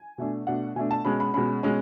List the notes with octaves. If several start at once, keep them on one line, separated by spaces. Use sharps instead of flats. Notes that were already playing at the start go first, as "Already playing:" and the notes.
Already playing: G#5
B2 A3 D4
B2 A3 D4 F#5
B2 A3 D4 G#5
A5
B2 G#3 C#4 B5
B5
B2 G#3 C#4 B5
B2 G#3 C#4